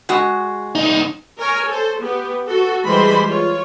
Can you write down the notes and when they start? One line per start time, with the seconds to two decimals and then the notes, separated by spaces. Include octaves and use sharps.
0.09 G#3 F#4
0.75 C2 D#4
1.39 A#4 C#5 G#5
1.68 A4 C5
2.00 B3 G4
2.47 F#4 A4
2.85 E3 G3 G#3 C5 B5 C6
3.28 F4 C#5